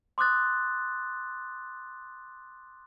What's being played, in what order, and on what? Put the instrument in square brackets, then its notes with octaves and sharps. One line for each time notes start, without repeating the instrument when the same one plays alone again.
[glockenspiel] C6 D6 D#6 F#6 A6